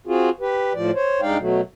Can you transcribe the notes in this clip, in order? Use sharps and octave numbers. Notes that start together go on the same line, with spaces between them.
C4 F4 F#4 G#4
G4 B4
A2 F3 D5
C5 C#5
G2 G#3 D#4 D5 F5 G5
B2 F#3 A3